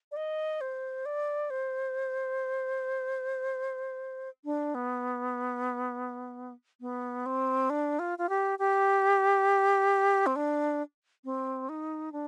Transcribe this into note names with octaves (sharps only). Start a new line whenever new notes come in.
D5
D#5
C5
D5
C5
D4
B3
B3
C4
D4
F4
F4
G4
G4
C4
D4
C4
D#4
D4